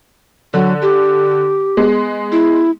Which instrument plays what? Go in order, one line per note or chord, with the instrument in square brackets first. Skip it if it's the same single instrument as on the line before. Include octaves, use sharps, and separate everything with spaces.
[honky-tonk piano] D3 [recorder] F#3
[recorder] G4
[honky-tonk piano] G#3 B3
[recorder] E4